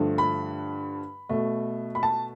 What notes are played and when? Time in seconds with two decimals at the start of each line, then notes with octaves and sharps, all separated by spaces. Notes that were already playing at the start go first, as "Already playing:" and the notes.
Already playing: G2 D3 F3 A3
0.18 B5
1.29 B2 A3
1.95 B5
2.03 A5